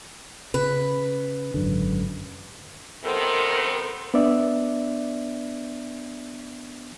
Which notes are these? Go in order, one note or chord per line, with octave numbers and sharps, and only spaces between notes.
C#3 B4
G#1 F#2 D3
C3 D#3 B3 A4 A#4 C5
B3 D4 D5 E5